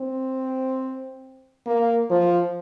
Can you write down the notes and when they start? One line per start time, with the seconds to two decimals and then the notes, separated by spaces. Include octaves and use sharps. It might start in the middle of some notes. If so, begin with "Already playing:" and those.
Already playing: C4
1.66 A#3
2.10 F3